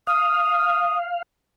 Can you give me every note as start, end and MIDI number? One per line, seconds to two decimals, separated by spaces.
0.07 1.22 77
0.07 0.98 87